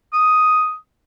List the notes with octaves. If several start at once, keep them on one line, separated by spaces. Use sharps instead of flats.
D#6